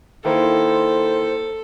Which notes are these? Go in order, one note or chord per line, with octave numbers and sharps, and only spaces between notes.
D#3 A#3 E4 A4 C5